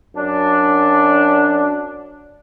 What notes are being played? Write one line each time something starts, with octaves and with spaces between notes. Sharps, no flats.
F#2 D4